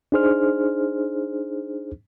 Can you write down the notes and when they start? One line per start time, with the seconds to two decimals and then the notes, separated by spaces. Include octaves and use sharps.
0.12 D4 D#4 G#4 C5 F6